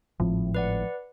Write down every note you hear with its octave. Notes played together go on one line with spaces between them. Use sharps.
G#1 A2 F3 C4
B4 D5 F#5